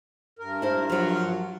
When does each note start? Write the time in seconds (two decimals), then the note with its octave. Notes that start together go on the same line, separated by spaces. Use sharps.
0.39 G2 A#4
0.62 E4 C5
0.90 F3 F#3